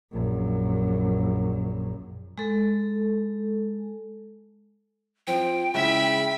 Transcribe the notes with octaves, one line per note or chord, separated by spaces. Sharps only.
A#1 F#2
G#3 A4
F3 C4 G5
C#3 G#3 E4 E5 B5